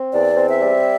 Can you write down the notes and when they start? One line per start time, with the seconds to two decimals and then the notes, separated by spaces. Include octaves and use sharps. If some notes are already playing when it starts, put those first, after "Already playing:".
Already playing: C4
0.12 E2 D5
0.37 C4
0.49 E5
0.61 G3